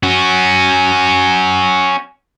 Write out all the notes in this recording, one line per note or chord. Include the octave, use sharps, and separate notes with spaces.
C#4 F#4